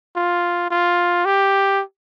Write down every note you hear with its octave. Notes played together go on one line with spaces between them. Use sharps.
F4
F4
G4